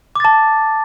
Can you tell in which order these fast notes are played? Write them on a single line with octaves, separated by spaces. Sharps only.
D6 A6 A5